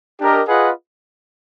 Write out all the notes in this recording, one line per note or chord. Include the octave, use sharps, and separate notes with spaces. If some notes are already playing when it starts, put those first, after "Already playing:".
D4 G4 A#4 D#5
F4 G#4 B4 D#5 F#5